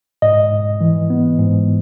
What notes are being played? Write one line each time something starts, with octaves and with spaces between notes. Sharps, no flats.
G#2 D#5
G#2
E3
B3
G#2